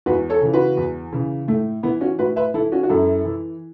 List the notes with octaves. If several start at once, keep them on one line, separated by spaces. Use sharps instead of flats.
E2 F#4 B4
A4 C#5
C#3 E3
F#4 B4
E2
C#3 E3
A2 A3
E3 B3 E4
C#4 F#4
A2 F#4 B4
B4 E5
E3 E4 A4
C#4 F#4
F#4
F#2 E4 A4
E3